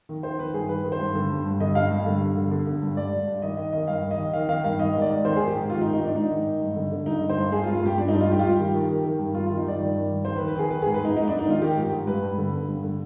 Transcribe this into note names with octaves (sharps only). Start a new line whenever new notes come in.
D#3
D#3 C5
D#3 B4
G2 G#4
D#3 B4
D#3
C5
G2
D3
G2
G2
D3 D#5
G2 F5
G2
D3
G2
D3
D3
D3
G2
G2 D5
G2
G2
D#3 D#5
D#3 D#5
D#3 D#5
G2 F5
D#3
D#5
D#3
D#3 F5
D#3 F5
G2 F5
D#3 D#5
G#2
D5
G#2
D#3 C5
G#4
D#3
G4
G#2
D#3 F4
D#4
G#2
D#4
G#2 D4
G#2 D#4
D#3
G#2
G2
D3
D3
G2 D#4
D3
C5
G2
G2 G#4
F4
G2
F4
G2 G4
G2 D4
D#4
G2
F4
G2 G4
F4
G2 G4
D#3
D#3
D#3
D#3
G2
D#3 F4
F4
D#3
D#4
G2 D5
D#3
G2
D#3
D#3 C5
B4
D#3
B4
D#3 G#4
D#3 B4
G#4
G#2
B4
G#2 D#4
G#2 D#4
D4
G#2
D#4
D#3 F4
D#3 G4
G#2
G#2
G2 B4
G2
D3
D3
G2
D3